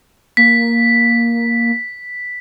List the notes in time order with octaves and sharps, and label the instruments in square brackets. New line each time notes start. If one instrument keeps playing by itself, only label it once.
[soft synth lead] A#3 [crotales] B6